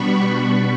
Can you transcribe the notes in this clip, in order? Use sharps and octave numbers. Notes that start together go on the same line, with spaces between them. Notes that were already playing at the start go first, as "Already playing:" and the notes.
Already playing: B2 G3 B3 D4 B5 C#6